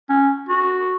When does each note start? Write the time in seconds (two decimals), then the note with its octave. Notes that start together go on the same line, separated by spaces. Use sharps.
0.10 C#4
0.49 F#4